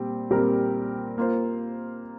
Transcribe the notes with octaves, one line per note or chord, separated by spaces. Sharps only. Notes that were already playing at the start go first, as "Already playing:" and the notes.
Already playing: A#2 G3 C4 G4
A#2 G3 C4 G4 A#4
A#3 F4 C5